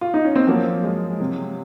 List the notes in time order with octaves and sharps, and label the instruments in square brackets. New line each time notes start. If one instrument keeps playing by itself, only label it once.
[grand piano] F4
D#4
C#4
C4
[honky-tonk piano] F3 [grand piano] F#3 A#3
[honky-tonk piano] G#3
C3